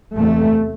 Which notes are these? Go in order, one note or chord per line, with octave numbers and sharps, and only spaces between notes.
E2 C3 A3